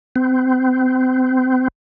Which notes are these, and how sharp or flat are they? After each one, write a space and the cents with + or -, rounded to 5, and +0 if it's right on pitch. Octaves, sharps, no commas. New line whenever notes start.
C4 -30